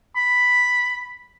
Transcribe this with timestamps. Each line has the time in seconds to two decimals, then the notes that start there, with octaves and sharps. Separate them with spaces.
0.16 B5